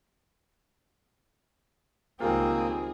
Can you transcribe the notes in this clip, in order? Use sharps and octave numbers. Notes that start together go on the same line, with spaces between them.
C#2 D#3 G3 A#3 C4 F4 G#4